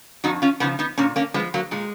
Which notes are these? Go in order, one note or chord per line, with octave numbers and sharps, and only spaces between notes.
F2 D#4 F#4
C#4 F4
C#3 F3 B3 D#4
B3 D#4
A#2 A#3 C#4
A#3 C#4
F3 G#3 B3
F#3 A#3
A#2 G#3